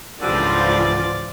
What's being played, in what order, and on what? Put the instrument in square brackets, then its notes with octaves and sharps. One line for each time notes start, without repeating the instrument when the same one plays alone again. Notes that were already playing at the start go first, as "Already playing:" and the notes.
[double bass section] C#2 G#2 E3 [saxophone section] D3 G3 [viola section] F3 F4 [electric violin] D5